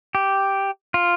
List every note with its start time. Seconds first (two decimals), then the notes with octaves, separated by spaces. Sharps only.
0.15 G4
0.94 F4